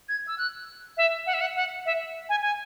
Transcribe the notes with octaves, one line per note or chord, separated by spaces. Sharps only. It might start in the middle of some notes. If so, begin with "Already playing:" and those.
G#6
E6
F#6
E5
F#5
E5
F#5
F#5
E5
G#5
G#5